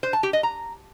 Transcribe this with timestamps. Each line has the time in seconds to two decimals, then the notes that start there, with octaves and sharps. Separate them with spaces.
0.03 C5
0.13 A5
0.23 G4
0.33 D#5
0.43 A#5